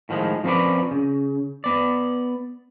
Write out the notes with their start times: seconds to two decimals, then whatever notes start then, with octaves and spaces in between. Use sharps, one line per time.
0.09 A2 D#3 F3 G3 G#3
0.44 F3 C4 C#4 A#4 B4 D5
0.91 C#3
1.64 B3 D5